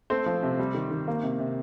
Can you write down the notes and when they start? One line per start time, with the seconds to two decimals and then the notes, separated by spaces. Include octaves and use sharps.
0.10 A3 C4 C5
0.26 F3
0.43 C3
0.59 G3
0.74 D#3
0.91 D#3
1.08 A#3
1.23 C3
1.39 C3